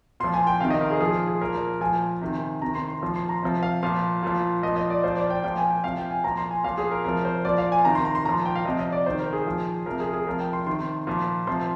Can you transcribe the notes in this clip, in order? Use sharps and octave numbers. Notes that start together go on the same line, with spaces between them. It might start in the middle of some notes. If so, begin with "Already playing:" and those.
A#2 F3 C6
G#5
G5
C3 D#3 F5
D#5
A#4
G#4
A#2 F3 G#4
G#4
A#2 F3 A#4
A#4
A#2 F3 G#5
C3 D#3
C3 D#3 A#5
C6
C6
A#2 F3
C6
A#5
C3 F3
F5
A#2 F3 F5
A#2 F3
A#2 F3 D#5
D#5
D5
A#2 F3 C5
D5
G5
A#2 F3 G5
G#5
G5
C3 F3 F5
G5
G#5
A#2 F3 A#5
C6
G#5
A#2 F3 F5
G#4
A#4
C3 F3 A#4
C5
A#2 F3 D5
F5
G#5
C3 D#3 A#5
C6
A#5
C6
A#2 F3 A#5
G5
F5
C3 F3 D#5
D#5
D5
C3 D#3 C5
A#4
G#4
A#2 F3
C3 F3 A#4
G#4
G#4
C3 F3 A#4
G5
C6
C3 D#3 C6
A#2 F3
C3 F3 C6